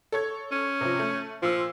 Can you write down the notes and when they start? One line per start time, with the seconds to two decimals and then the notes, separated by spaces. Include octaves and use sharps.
0.12 A4 C#5 G#6
0.51 C#4
0.81 C3 F3
0.99 A3
1.42 A#2 F3 E6